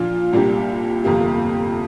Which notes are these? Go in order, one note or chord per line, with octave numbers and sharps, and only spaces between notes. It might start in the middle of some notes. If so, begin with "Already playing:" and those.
Already playing: A#2 F3 D4 F4
C2 A#2 A#3 D4 G4
G1 F2 C3 A#3 G4